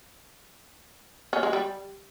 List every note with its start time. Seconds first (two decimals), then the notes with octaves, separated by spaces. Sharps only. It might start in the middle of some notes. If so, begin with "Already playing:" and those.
1.33 C#4
1.43 G#3
1.53 G3